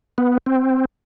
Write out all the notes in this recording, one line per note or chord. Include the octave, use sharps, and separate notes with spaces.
B3
C4